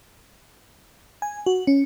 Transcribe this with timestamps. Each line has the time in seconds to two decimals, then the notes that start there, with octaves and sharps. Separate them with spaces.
1.22 G#5
1.46 F#4
1.67 C#4